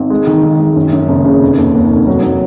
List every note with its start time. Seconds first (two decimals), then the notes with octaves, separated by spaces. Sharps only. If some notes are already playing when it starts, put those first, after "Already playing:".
Already playing: G#1
0.10 G#3
0.27 D#3
0.43 D#3
0.59 G#3
0.76 F#2
0.92 F#2
1.09 F#1
1.25 C#3
1.41 F1
1.58 D#2
1.74 D#2
1.91 F1
2.07 F#3
2.23 F#3